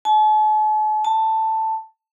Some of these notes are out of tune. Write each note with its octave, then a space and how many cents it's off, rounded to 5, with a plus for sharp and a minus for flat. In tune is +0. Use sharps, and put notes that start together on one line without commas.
A5 -45
A5 +10